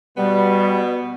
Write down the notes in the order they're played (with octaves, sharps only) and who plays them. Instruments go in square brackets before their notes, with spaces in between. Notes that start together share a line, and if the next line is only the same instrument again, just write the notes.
[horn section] B2 B3 [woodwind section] G3